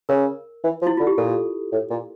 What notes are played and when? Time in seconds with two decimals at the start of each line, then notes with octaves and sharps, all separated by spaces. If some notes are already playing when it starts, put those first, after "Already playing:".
0.09 C#3 A#4
0.64 E3
0.82 F3
0.87 E4
0.97 D3 F4
1.07 G4
1.18 A#2 A4
1.72 A2
1.90 A#2